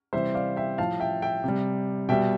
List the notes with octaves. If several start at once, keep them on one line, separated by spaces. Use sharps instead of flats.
C3 E3 G3 C5 E5
D5 F5
E5 G5
A2 F3 F5 A5
E5 G5
E5 G5
C3 G3
B2 G3 E5 G5